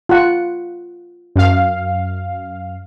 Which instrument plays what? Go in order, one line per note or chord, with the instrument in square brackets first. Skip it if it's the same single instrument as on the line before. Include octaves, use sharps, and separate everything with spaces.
[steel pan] F4 F#5
[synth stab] F#2 F5